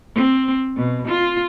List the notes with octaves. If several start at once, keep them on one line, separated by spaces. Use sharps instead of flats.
C4
B2
F4